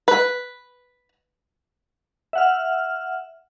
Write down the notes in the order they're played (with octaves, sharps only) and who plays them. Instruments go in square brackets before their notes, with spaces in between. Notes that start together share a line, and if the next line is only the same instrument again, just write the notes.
[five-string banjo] B4
[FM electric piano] E5 F#5 F6